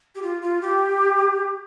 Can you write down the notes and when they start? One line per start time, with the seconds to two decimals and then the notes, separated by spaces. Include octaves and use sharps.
0.15 G4
0.22 F4
0.42 F4
0.61 G4